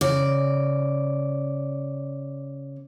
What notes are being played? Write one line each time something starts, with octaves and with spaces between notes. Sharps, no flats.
C#3 D5